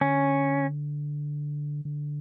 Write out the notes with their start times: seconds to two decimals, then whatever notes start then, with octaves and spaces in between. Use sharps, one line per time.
0.01 D3 C#4
1.85 D3